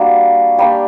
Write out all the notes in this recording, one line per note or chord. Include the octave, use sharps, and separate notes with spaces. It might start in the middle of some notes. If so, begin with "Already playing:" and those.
Already playing: G3 A#3 D4 F#4
G3 A#3 D4 G4